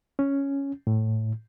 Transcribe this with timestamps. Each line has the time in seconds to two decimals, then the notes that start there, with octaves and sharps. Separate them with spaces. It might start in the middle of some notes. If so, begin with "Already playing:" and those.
0.19 C#4
0.87 A2